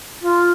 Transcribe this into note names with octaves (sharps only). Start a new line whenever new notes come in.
F4